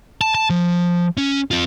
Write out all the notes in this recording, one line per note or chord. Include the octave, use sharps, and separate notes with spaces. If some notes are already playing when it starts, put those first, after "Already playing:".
A5
A5
F3
C#4
C4 F4